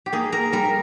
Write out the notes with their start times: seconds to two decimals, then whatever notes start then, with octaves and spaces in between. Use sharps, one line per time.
0.06 G4
0.13 A#3 G#4
0.32 A#4
0.53 G3 A#4